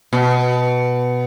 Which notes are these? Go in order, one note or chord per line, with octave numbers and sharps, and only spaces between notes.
B2